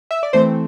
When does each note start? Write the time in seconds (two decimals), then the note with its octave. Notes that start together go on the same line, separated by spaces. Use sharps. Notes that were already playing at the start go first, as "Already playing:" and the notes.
0.11 E5
0.23 D5
0.33 E3 A3 C4 C5